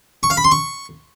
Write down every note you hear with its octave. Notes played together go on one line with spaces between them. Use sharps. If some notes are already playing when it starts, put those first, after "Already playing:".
C#6
F5
B5
C6
C#6